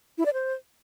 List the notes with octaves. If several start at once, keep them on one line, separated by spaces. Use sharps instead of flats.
E4
D5
C5